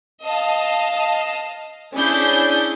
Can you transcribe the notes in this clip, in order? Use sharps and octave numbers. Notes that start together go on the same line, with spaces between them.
D#5 F5 A5
C#4 D4 E4 G#4 G6